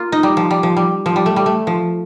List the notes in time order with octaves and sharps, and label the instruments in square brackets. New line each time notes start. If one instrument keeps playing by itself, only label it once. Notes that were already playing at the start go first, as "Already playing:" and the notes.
Already playing: [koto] A#3 F4
D#4
G3
F3
G3
F3
G3
F3
G3
A3
G3
A3
F3